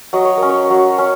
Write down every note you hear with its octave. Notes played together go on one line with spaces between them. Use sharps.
F#3 D#5
C#5
C#4 A#4
C#5
F#3
C#4